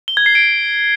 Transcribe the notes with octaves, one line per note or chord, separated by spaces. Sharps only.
G7
G#6
C7
D7